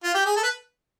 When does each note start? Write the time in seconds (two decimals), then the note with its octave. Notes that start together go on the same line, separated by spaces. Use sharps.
0.04 F4
0.15 G4
0.26 G#4
0.37 A4
0.43 B4